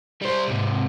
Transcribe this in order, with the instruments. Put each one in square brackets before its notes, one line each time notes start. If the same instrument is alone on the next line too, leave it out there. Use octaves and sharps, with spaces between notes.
[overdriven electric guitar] G3 C5
G#2 C3